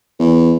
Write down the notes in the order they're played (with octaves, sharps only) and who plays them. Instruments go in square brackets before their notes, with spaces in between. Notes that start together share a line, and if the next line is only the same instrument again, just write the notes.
[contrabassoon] E2